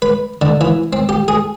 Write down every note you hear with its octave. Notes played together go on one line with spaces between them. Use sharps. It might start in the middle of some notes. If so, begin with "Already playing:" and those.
B4
D3
E3
C4
G4
G#4